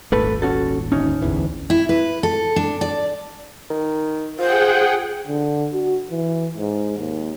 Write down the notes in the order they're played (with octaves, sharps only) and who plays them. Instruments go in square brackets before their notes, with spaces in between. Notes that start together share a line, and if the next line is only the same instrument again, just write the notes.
[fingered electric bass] D#1 G#1 [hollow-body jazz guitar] A3 A4 B4
[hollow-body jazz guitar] C#4 F#4 A4
D2 C#4 D#4
[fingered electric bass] A1 E2 E3
[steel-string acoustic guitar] E4
B4
A4
D4
D5
[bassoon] D#3
[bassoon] F4 [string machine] G#4 F#5 G5 [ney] C5
[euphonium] D3
F#4
E3
G#2
D#2